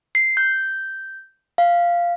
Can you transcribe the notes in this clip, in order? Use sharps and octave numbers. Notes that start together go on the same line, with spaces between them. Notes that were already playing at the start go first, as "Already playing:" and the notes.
C7
G6
F5